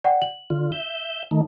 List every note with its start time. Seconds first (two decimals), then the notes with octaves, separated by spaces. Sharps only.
0.04 D5 F#5 G5
0.22 F#7
0.50 D3 F4
0.72 E5 G6
1.31 D#3 A3 D#4